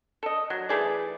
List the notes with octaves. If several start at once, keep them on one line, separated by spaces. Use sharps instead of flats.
A4 D#5
F#3
E3 A3 G#4 D5